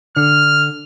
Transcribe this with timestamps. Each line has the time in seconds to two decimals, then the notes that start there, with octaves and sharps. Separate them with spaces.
0.16 D3 F6